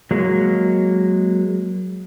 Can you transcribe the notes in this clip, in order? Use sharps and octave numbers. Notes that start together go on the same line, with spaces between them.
F#3 G#3 A#3